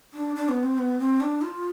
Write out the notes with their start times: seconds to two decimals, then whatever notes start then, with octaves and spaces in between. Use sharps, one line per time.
0.14 D4
0.36 D4
0.49 B3
0.63 C4
0.78 B3
0.99 C4
1.20 D4
1.42 F4